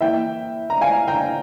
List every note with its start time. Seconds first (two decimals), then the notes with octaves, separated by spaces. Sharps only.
0.01 E3 A#3 E4 E5 G5
0.70 A#5
0.81 F5 G#5
1.08 G5 A#5